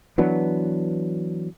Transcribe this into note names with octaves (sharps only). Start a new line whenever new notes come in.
E3 F#3 B3 D4